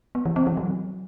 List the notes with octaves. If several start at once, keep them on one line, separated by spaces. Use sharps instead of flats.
B3
E3
C4
E3
F#3